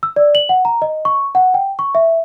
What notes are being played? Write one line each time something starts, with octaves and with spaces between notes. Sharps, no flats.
E6
D5
F#7
F#5
A#5
D#5
C#6
F#5
G5
C#6
E5